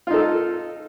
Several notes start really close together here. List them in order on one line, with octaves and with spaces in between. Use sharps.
F4 D#4 A4